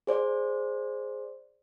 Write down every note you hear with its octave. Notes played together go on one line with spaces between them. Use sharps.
G#4 C5 D5